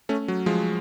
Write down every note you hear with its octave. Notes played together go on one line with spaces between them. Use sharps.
A3 C#4
F#3
F3 G#3